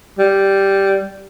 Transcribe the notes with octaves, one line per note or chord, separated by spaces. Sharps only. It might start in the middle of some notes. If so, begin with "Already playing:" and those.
G3